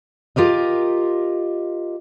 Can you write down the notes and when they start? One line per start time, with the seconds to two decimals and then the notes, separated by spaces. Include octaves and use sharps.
0.36 F4 G4 A#4 D#5